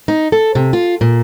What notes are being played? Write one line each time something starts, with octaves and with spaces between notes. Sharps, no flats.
D#4
A4
C3
F4
A#2